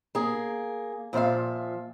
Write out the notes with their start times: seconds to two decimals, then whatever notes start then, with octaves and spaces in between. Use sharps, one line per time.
0.15 A#3 G#4
1.13 A#2 F3 C5 E5 F5